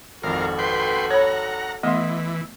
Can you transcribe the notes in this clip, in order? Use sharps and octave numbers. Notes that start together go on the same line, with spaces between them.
G#1 F2 F#4 A4 A#4 F5
B4 G5 C6
C#5 F#5 A#5 B5
E3 A3 B3 D#5 E5 C6